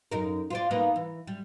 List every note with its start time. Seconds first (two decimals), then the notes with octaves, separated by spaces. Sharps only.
0.11 F#2 D#4 A#4
0.50 F4 C5 D5
0.71 A#3 B3 D#4
0.96 E3
1.27 G3